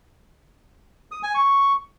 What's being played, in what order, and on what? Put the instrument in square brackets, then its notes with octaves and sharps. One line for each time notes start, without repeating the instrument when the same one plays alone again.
[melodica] D#6
G#5
C#6